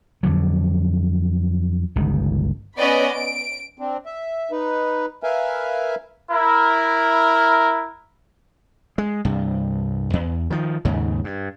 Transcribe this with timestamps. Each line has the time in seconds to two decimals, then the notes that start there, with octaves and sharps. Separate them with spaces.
0.23 F2 D3 F#3
1.96 G1 C#2 D#3
2.77 B3 C#4 D5 D#5 B5
3.11 D7
3.79 C4 D4
4.06 E5
4.51 D#4 B4
5.23 A#4 B4 E5 F5 G#5
6.32 E4 A#4
8.98 G#3
9.25 C2 G2
10.13 E2
10.50 D#3 F3
10.85 D#2 G#2 C#3
11.24 G2